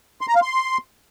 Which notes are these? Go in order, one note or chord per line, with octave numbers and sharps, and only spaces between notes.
C6
A#5
F5
C6